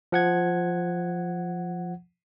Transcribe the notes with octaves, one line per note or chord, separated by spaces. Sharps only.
F3 F#5 G#6